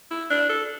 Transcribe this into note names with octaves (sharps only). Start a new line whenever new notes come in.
E4
D4
A4